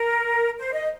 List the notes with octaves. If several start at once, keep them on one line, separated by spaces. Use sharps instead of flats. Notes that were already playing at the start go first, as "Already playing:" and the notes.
Already playing: A#4
C5
D#5